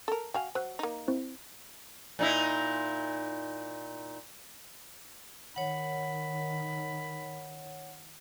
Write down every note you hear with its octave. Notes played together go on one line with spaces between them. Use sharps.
A4 A#4
F#4 F5 G5 G#5
F#3 C5 F#6
A#3 D#4
C4 E4 C5
A#2 D#4 E4
D#3 C#5 F#5 B5